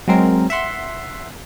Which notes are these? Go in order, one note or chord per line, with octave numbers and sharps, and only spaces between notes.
F#3 G#3 C4 A#4
E5 F#5 C6